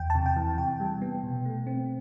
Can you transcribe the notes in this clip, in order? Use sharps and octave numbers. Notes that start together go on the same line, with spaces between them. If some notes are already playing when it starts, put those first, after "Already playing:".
Already playing: E2 G5
A5
C3
G5
E3
C3 G5
G3
B3
B2
A3
C4